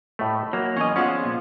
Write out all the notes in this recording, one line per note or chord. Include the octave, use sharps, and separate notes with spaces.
A2 A3 D#5 B5 E6
F#3 A#3
E2 C#4 C#5 D#5 G#5 C6
F3 G#3 B3 C#4 F4 D5 F#5
A#2